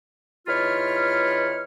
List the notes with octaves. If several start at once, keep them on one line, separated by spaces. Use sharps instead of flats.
E2 D#4 F4 C#5 B5 F6